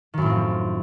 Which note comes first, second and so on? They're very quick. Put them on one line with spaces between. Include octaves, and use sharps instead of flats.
D#3 F#2 A2 C4 F3